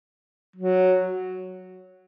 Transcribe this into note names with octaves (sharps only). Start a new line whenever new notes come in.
F#3